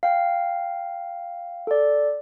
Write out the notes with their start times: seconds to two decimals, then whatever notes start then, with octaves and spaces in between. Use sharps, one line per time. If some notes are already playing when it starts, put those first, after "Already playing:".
0.03 F5 G5
1.67 A4 D5